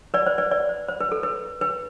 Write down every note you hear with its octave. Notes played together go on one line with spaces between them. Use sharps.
B4 D5
C5
B4 D5
B4 D5
C5
C5
B4
A4
B4
B4